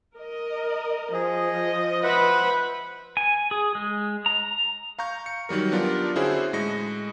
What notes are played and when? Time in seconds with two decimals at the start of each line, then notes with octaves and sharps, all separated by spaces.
0.16 A#4 D#5
1.13 F3 G#4 D#5
2.03 B4 C5 E5 F#5 B5
3.17 G#5
3.51 G#4
3.75 G#3
4.26 A#5
4.99 F5 A#5 C#6 G6
5.26 C#7
5.49 D#3 F#3 G3 A#4
5.72 B3 D4 F4 G4 A#4 D5
6.16 D3 C#4 E4 F#4 G#4 C5
6.53 A2 G#3 D#5 A#6 C#7